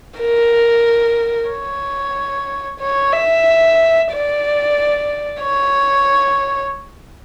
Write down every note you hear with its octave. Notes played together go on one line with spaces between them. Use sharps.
A#4
C#5
C#5
E5
D5
C#5